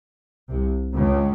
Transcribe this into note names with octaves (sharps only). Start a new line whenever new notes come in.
C2 C3
C#2 C#3